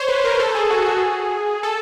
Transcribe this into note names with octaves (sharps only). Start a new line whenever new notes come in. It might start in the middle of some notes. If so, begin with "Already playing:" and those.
Already playing: C5 C#5
B4
A#4
A4
G#4
F#4
G#4
A4